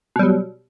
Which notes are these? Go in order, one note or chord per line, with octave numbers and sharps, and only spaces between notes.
B2 F#3 G3